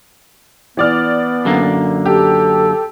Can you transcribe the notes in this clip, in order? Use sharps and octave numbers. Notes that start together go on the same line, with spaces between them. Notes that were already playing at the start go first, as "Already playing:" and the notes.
E3 B3 D5 F6
F#2 D3 A#3
G4 A4